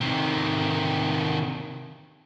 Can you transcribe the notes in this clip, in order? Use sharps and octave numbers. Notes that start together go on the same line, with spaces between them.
C3 D#3